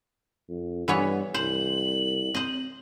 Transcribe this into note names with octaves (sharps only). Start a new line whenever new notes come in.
F2
G2 E3 B3 C#5
C2 C5 F#7
C4 C5 D#5